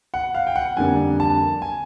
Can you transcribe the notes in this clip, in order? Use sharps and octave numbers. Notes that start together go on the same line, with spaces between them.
F#5
F5
G5
F#5
F2 D3 G3 A#3 D4 G#5
A5
G#5